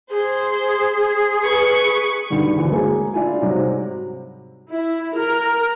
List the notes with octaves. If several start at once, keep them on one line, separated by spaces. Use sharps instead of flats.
G#4 C5
B4 C#6
B1 G2 D3 D#3 G3
D2 D3 E3
F#3 G#3 A#3 G#4
D4 E4 F4 G#5
G#2 C3 F#3 G3
E4
A#4